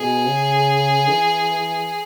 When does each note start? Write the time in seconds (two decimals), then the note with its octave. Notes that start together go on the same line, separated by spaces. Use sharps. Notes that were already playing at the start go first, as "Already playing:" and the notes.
Already playing: B2 G#4
0.26 C#3
1.08 E3